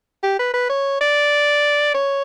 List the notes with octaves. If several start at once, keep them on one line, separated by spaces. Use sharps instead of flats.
G4
B4
B4
C#5
D5
C#5